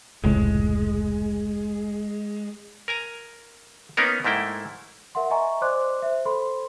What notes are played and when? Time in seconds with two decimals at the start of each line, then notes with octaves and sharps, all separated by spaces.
0.24 F1 C#2 A2 G#3
2.88 A#4 G#5 A#5
3.97 A#3 B3 C#4 D#4 A#4
4.24 G#2 A3 A#3 E4 G5
5.15 A#4 E5 F#5 C6
5.30 D#5 E5 G#5 A#5 C#6
5.61 C5 D5 D#5 C6 D6 F#6
6.02 C5 E5
6.25 A4 C5 B5 C6